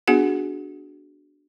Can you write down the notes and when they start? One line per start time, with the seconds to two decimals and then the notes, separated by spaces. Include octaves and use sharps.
0.08 B3 D4 F#4 G#4 F#5